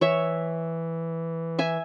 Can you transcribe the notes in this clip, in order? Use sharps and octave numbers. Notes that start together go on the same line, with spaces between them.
E3 C#5 E5
E5 G#5